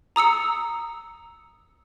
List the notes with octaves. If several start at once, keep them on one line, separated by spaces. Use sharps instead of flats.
A#5 D#6 E6 C#7